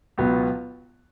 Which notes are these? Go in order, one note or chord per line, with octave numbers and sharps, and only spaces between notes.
C#2 B2 F#3 B3 F#4